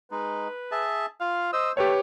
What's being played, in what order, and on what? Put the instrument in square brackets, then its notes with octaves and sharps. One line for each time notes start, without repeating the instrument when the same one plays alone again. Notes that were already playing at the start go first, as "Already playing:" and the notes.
[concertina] G#3 D#4 [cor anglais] B4
[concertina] G#4 E5 A5
[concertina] F4 [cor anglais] F5
[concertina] C5 E6 [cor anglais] D#5
[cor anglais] A3 [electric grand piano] G4 B4 C#5 [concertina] G5